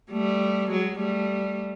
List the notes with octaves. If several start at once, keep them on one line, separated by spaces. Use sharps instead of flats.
G3 A3
F#3 G#3
G3 A3